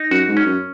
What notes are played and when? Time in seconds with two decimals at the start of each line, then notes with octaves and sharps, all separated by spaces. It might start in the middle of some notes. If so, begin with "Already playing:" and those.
Already playing: D#4
0.11 F#2 F#4
0.28 G#2
0.37 C#4
0.45 F#2